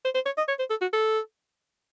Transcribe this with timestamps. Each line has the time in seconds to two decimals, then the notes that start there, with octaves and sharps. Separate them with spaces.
0.04 C5
0.15 C5
0.26 C#5
0.38 D#5
0.48 C#5
0.59 C5
0.70 A4
0.81 F#4
0.93 A4